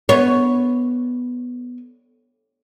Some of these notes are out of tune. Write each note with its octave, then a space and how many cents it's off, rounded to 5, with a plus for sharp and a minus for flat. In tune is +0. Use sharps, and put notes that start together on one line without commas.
B3 +0 C#5 +0